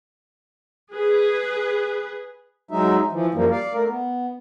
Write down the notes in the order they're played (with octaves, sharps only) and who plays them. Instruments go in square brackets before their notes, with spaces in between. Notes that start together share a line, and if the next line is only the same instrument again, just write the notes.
[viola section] G#4 B4
[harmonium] F#3 G#3 D#4 E5
E3 F3
F#2 F3 G3 A#3
D5 F5
A3 A#4
B3